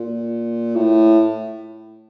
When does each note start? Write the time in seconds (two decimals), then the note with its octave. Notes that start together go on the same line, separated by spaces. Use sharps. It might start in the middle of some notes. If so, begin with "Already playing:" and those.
Already playing: A#2
0.76 A2